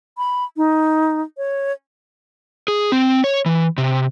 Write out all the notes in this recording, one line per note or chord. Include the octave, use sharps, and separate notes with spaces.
B5
D#4
C#5
G#4
C4
C#5
E3
C3